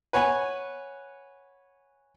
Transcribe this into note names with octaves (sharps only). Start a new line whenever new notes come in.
B4 C#5 F#5 G#5